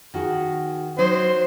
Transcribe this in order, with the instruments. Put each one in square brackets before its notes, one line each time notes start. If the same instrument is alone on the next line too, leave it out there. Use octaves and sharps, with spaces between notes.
[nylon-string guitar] D#3 F#4 G#4
[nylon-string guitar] F#3 D#4 D#5 [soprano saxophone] C5